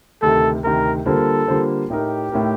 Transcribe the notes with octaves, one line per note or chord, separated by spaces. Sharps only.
D2 C3 D#3 A4
D2 C3 D#3 A#4
D3 G3 A#3 F4 A4 C5
D3 G3 A#3 F4 C5
A2 A3 D#4 G4 A#4
A2 A3 D#4 A#4